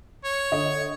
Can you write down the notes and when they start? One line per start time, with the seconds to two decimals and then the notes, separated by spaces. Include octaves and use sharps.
0.25 C#5
0.52 D3 D#5